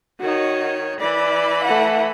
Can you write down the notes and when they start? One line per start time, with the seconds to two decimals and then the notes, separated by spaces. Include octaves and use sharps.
0.21 D#3 D#4 F#4 C#5
1.00 E3 D5 B5
1.65 A3 F#5